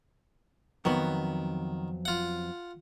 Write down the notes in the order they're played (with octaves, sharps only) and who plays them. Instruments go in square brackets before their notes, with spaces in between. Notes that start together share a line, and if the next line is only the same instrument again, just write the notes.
[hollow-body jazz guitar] F2 F#3 B3 [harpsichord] D#3
[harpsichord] F4 F#5